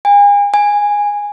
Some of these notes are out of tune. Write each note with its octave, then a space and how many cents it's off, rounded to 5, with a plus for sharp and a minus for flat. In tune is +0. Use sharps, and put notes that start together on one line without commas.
G#5 -40
G#5 -10